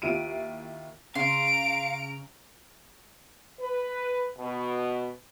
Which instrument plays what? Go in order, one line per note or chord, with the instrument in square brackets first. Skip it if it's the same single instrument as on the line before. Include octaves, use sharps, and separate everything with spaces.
[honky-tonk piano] D#2 E4 F4 D7 D#7
[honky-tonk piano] C#3 [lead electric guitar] F5 [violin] A#5 D7 [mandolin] C6
[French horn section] B4
B2